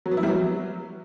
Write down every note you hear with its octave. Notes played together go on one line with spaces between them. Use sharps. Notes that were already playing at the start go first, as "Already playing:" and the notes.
F#3
B3
E4
G3
F#3